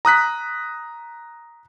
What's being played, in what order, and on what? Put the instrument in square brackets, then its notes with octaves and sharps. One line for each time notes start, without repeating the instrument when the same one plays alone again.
[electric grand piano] A#5 D#6 F#6 B6